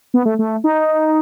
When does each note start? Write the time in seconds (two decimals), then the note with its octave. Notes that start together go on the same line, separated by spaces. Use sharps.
0.14 B3
0.26 A3
0.39 A3
0.64 D#4